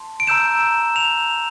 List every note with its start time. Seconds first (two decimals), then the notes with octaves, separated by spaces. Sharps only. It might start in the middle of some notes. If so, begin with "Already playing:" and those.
Already playing: A5 C6
0.20 D7
0.27 A#5 E6 G6 E7
0.96 F7